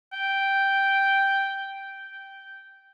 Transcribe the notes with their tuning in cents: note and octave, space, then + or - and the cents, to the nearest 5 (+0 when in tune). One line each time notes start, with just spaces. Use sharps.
G5 +0
G5 -10